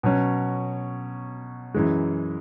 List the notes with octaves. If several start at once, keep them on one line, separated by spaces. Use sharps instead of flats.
B2 F#3 C#4
F#2 E3 G#3